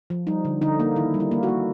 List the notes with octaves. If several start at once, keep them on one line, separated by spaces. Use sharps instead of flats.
F3
G3 D#4
D3
D3 D#4
A#3
D#3 E4
G3
E4
A#3
F#4
A#3